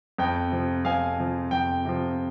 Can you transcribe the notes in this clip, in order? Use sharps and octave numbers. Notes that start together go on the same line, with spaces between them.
F2 G5
C3 F3
F2 F5 G#5
C3 F3
F2 G5
C3 F3